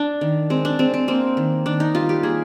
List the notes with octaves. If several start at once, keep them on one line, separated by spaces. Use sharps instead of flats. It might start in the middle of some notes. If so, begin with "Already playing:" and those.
Already playing: D4
D#3
G#3 C4
D4
G#3 C4
C4
A#3 C4
D#3
D#3 D4
D#4
G3 F4
G4
A#3 G#4